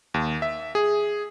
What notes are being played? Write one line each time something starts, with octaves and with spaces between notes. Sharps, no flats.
D#2
E5
G#4